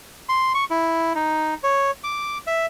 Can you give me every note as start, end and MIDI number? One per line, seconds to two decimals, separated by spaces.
0.29 0.53 84
0.55 0.64 85
0.70 1.13 64
1.15 1.54 63
1.63 1.91 73
2.04 2.38 86
2.47 2.66 76